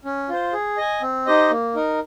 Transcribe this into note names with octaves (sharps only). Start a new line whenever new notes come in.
C#4
F4 C5
G#4
D#5 G#5
C4
D#4 G4 C5 D#5
A#3
D#4 A#4